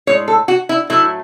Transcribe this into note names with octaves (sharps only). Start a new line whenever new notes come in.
A2 G#3 C#5
A4
F#4
E4
A2 F#3 A3 E4